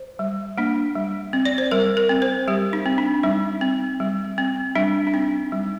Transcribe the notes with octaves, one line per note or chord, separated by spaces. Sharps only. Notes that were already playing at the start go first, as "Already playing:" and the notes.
Already playing: C5
G3
A#3 D4
G3
C4
D5
C5
G3 A#4
A#4
C4
C5
G3 G4
D#4
C4
D4
G3 D#4
C4
G3
C4
G3 D4
D4
C4 D#4
G3